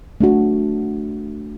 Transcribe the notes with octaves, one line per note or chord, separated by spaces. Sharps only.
A3 D4 F#4